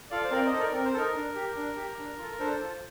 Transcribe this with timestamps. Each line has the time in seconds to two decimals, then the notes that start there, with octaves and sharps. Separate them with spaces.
0.11 F4 A4 D5 F5
0.24 C5
0.31 C4 A#4 D5
0.46 C5 D#5
0.53 D#4 A4
0.59 A#4 D5
0.73 C4 A#4
0.85 C5
0.94 D#4 A4 A#4
1.15 D4
1.35 G4
1.56 D4
1.77 G4
1.98 D4
2.19 F4 A4
2.39 D4 A4 C5
2.60 F4 A4